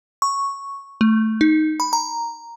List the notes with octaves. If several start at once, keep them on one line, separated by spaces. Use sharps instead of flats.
C#6
A3
D#4
B5
A#5